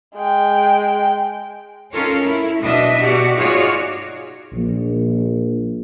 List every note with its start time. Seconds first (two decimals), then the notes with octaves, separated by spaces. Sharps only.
0.16 G#3 G5
1.92 C#4 D#4 F4 A4 A#4 C#5
2.25 E4
2.62 B2 D4 D#5 E5
3.01 B2 F#4 G4 D5
3.37 D#4 F4 F#4 G#4 C#5 D5
4.52 A#1